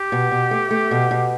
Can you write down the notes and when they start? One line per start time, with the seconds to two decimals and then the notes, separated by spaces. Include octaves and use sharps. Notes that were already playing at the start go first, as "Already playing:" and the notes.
Already playing: G4
0.12 B2
0.31 B2
0.51 A3
0.71 A3
0.91 B2
1.11 B2